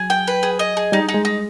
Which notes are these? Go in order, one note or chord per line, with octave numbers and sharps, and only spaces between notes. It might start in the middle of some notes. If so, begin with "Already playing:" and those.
Already playing: F#3 G#4
G5
B4
G#4
D#5
G#4
G3 D#4
D#4
G#3
D#4